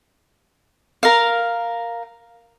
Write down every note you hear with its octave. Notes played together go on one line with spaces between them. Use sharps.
A#4 F5